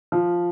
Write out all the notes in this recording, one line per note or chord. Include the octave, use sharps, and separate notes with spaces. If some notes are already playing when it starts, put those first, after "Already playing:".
F3